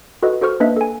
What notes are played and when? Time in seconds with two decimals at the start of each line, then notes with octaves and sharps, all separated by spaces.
0.22 F#4 A4 B4 D#5
0.41 F#4 A4 C5 C#6 F6
0.60 A#3 D4 B4 D#5 E5
0.76 A4 G#5